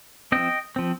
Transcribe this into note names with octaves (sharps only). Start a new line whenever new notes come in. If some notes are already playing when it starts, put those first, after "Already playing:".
F3 C4 D#5 G5
F3 C4